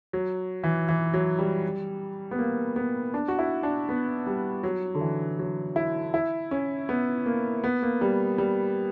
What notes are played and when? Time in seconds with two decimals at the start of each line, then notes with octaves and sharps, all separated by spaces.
0.13 F#3
0.64 E3
0.89 E3
1.14 F#3
1.38 G3
2.31 B3
2.39 A#3
2.76 B3
3.14 D4
3.28 F#4
3.39 E4
3.63 D4
3.89 B3
4.27 G3
4.63 F#3
4.95 D3
5.01 E3
5.39 F#3
5.76 E4
6.14 E4
6.51 C#4
6.89 B3
7.26 A#3
7.64 B3
7.82 A#3
8.01 G3
8.38 G3